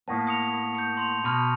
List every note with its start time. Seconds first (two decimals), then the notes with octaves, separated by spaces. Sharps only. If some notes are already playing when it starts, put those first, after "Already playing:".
0.08 A2 A#3 B3 A5
0.27 D#6 C#7 F7
0.75 G6 C#7
0.97 C6 F7
1.24 B2 A5 B5 F6